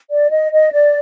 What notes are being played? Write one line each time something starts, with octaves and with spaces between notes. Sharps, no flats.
D5
D#5
D#5
D5